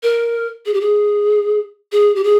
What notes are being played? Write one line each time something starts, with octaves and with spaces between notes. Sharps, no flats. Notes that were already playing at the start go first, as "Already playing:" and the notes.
A#4
G#4
G4
G#4
G#4
G4
G#4